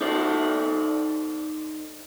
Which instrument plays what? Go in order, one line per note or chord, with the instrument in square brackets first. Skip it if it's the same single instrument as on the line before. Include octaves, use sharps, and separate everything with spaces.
[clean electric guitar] D#4 A4 C5 D5